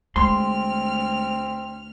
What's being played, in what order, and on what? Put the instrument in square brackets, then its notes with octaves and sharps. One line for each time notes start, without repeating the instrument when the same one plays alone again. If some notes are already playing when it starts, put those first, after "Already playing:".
[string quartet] D2 F6 [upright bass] G#3 [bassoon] C4 [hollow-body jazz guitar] C6